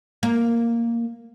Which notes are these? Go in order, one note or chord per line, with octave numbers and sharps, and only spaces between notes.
A#3